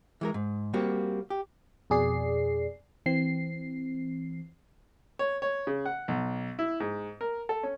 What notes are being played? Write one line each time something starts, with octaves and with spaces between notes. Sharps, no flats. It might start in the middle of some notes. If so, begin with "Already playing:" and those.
E3 G#3 A#4
G#2
G3 A#3 C4 F#4
G4
F2 B2 G#4 D5 C7
E3 C4 C7
C#5
C#5
C#3
F#5
B1
E4
G#2
A#4
A4
C#4